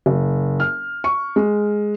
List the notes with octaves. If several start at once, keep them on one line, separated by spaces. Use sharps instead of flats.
F#1
F6
C#6
G#3